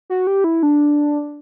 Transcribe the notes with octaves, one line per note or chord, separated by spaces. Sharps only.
F#4
G4
E4
D4